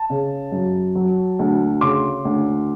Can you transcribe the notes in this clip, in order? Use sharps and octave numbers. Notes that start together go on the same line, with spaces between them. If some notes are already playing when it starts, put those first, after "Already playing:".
Already playing: A5
C#3
F#2
F#3
D2
C#3 C6 D6
D2